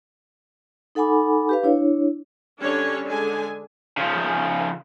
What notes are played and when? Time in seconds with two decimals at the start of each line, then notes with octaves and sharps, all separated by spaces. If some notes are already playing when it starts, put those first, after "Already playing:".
0.95 D#4 A4 F#5 G#5 B5 D6
1.49 G4 B4 F5
1.63 D4 E4 C#5
2.61 D3 G3 C#4 D4 C#5
3.04 D3 G#3 D4 G#5
3.98 C#3 F3